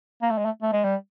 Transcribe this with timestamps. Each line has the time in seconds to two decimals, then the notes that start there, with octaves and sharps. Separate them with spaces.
0.22 A#3
0.30 A3
0.38 G#3
0.45 A3
0.62 A3
0.73 G#3
0.84 G3